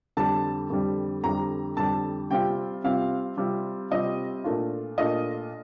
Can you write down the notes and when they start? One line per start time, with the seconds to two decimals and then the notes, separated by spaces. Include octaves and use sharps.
0.17 F2 D3 G3 A5
0.70 F2 D3 G3
1.24 F2 D3 G3 A#5
1.77 F2 D3 G3 A5
2.30 C3 G3 C4 F4 G5
2.84 C3 G3 C4 F4 F5
3.37 C3 G3 C4 F4
3.91 C3 G3 C4 F4 D#5
4.44 A#2 A3 D4 F4
4.98 A#2 A3 D4 F4 D#5